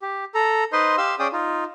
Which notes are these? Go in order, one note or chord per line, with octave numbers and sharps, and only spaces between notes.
G4
A4 A#5
D#4 B4 C5 D#5 C6
G4 F5 C6 E6
C#4 G#4 D5 G5 D#6
D#4 F4